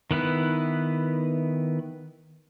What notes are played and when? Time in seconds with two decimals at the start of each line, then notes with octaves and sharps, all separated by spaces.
0.11 D#3 B3 E4 B4